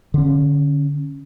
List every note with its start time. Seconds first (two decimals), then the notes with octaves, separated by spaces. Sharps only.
0.14 D3 C#4